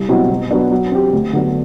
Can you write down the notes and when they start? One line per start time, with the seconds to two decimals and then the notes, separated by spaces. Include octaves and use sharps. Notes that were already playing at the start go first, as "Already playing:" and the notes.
Already playing: C2
0.09 B2 F#3 C4 E4
0.30 B2
0.51 F#3 B3 D4
0.72 F#3
0.92 C4 G4
1.13 D2
1.33 D3 F#3 B3 D4